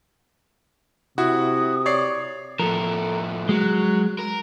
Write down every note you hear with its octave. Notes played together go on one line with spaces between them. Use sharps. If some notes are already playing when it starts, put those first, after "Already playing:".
C3 E4 F#4 D#6
C#5 D5 C7
A2 F3 A4 A#4
F#3 G#3
A#4